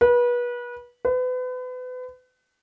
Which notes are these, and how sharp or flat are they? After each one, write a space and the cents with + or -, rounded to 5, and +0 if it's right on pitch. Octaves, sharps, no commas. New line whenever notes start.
B4 -30
B4 +35